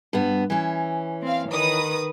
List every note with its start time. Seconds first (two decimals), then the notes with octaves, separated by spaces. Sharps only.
0.13 G2 B3
0.50 E3 C#4
1.24 C4 F5
1.52 D#3 B4 D#6